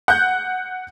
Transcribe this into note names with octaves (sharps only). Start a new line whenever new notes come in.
F#5 F#6 G6